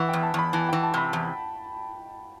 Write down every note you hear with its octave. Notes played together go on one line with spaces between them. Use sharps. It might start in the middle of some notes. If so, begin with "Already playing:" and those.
Already playing: E3 F#5
E2 G5
A5
E2 B5
E3 A5
E3 G5
A5
C3 B5
E2